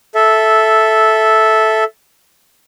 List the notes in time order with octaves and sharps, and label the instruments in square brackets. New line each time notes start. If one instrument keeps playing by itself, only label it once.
[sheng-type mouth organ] A4 E5